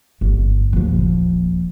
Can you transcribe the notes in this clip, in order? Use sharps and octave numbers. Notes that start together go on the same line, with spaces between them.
G1
D#1 F3